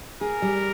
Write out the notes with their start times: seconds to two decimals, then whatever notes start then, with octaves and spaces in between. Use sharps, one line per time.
0.21 G#4 A#4
0.42 G3